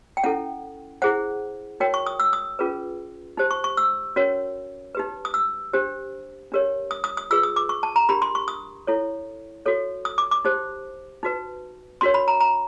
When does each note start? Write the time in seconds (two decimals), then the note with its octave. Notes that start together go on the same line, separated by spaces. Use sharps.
0.17 G5
0.24 C#4 E4 A4 F#5
1.02 E4 G#4 C5 F#5
1.80 D#4 F#4 A#4 C#5 G5
1.94 C#6
2.06 D#6
2.20 E6
2.33 D#6
2.59 C#4 F4 G#4 B4
3.37 D#4 G4 C5
3.51 C#6
3.64 C#6
3.77 E6
4.16 C#4 F#4 A#4 C#5
4.95 D#4 G4 B4
5.25 D#6
5.34 E6
5.73 D4 G4 C5
6.52 D4 G4 A#4 C#5
6.91 D#6
7.04 D#6
7.17 D#6
7.31 F4 G#4 B4 E6
7.43 D#6
7.56 D6
7.69 C#6
7.83 A5
7.96 A#5
8.09 D4 G4 A#4 B5
8.22 C6
8.35 C#6
8.48 D#6
8.87 E4 A4 C#5
9.66 F#4 A4 C#5
10.05 D#6
10.18 D6
10.31 D6
10.45 D#4 G4 C5
11.23 D#4 F#4 B4
12.01 D4 F#4 A#4 C#5 C6
12.14 B5
12.28 A#5
12.41 A#5